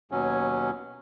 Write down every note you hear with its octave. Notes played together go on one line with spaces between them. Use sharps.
D#2 B2 F#3 C#4